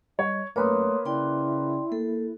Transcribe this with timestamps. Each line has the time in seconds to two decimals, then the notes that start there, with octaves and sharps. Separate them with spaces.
0.19 G3 C#5 D#5
0.56 F#2 A3 A#3 B4 C#5 C6 D#6
1.05 C#3 E4 D5 G5 C6
1.92 A#3 A4